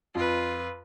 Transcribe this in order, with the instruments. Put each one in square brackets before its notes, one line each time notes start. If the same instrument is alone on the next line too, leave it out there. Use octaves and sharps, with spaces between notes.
[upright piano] F2 [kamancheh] F4 B4